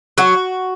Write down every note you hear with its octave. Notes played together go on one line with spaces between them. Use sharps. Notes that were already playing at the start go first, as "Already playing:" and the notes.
F#3 F#4